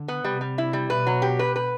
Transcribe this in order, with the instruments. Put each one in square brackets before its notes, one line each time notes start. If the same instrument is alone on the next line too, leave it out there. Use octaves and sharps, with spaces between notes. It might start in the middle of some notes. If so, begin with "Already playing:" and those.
Already playing: [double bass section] D3
[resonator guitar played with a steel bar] B3
[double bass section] C3 [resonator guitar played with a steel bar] G3
[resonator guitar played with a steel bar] G3
E4
G3
[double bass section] B2 [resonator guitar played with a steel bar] B4
[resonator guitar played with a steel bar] F#3
G4
B4
B4